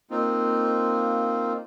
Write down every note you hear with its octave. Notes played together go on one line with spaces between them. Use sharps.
A#3 C4 D#4 F4